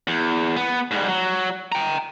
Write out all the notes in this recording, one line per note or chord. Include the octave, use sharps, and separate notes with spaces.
E2
B3
G#2 G3
F#3
G5 A#5